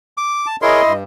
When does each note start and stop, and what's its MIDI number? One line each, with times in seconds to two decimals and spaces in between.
0.17 0.47 86
0.46 0.56 81
0.62 0.93 64
0.62 0.82 68
0.62 0.82 70
0.62 0.82 73
0.62 0.91 75
0.62 0.93 84
0.86 1.04 43